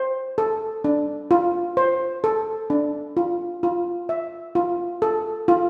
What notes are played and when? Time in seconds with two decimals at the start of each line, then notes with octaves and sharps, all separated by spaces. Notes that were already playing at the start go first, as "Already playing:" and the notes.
Already playing: C5
0.38 A4
0.84 D4
1.31 F4
1.77 C5
2.24 A4
2.70 D4
3.17 F4
3.63 F4
4.09 E5
4.55 F4
5.02 A4
5.48 F4